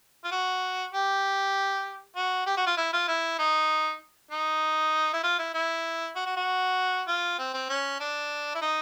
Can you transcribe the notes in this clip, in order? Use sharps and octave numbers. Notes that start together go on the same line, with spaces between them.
F4
F#4
G4
F#4
G4
F#4
F4
E4
F4
E4
D#4
D#4
E4
F4
E4
E4
F#4
F#4
F#4
F4
C4
C4
C#4
D4
E4
D#4